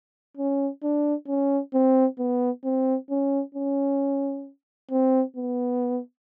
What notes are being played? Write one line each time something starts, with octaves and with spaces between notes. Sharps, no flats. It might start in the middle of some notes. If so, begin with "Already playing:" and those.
C#4
D4
C#4
C4
B3
C4
C#4
C#4
C4
B3